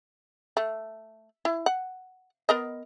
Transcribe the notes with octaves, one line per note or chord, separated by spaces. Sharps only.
A3
E4
F#5
B3 A#4 D#5